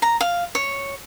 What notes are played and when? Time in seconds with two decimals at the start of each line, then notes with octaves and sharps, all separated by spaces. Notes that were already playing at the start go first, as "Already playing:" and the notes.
0.02 A#5
0.21 F5
0.55 C#5